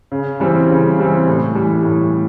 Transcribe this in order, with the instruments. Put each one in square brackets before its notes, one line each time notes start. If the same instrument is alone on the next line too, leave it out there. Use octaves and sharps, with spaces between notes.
[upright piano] C#3
E3 G3 C4
C#3
E3 G3 C4
A2
E3 G3
A2